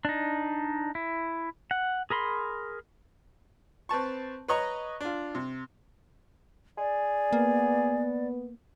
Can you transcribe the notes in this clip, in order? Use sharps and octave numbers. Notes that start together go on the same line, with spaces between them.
D4 D#4
E4
F#5
G#4 A#4 B5 C6
C4 B4 A5 C#6
B4 C#5 D#5 A#5 C#6
D4 F4
C3
G#4 D5
A#3 B3